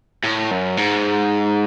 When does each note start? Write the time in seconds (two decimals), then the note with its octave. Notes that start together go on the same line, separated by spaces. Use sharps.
0.24 A2
0.51 F#2
0.77 G#2